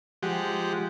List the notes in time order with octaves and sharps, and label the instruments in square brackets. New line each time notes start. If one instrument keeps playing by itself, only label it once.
[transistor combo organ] F3 G#3 G4 F#5